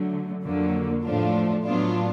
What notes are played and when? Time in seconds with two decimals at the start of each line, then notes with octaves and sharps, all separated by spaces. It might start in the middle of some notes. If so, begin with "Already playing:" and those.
Already playing: D3 F#3 A3
0.44 F2 D3 F#3 A#3
1.04 A2 F3 A3 D4 F4
1.65 A2 F#3 B3 D4 F4